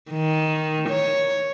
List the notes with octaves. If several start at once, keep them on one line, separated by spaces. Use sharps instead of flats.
D#3
C#5